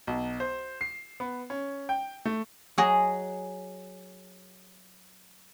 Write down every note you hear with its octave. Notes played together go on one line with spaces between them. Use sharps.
B1
C5
C7
B3
C#4
G5
A3
F#3 G#4 D#5